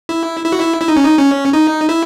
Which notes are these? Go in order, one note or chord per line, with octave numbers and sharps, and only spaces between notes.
E4
E4
F#4
E4
E4
D#4
C#4
D#4
C#4
D#4
E4